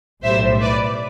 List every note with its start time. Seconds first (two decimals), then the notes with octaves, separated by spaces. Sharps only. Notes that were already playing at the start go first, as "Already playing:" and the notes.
0.23 B1 A2 G3 C5 E5
0.61 B4 D5